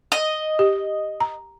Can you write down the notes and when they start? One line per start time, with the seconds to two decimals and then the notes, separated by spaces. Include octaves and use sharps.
0.12 D#5
0.59 G4
1.20 A#5